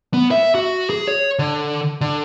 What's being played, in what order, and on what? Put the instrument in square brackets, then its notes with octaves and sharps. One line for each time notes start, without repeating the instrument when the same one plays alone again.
[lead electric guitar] B3
E5
F#4
G#4
C#5
D3
D3